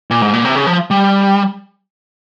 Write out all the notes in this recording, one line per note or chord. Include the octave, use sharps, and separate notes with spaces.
A#2
G#2
A#2
C3
C#3
F3
G3